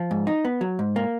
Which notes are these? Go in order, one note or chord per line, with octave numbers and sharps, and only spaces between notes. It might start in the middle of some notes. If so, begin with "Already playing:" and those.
Already playing: F3
G#2
D#4
B3
F#3
G#2
A#3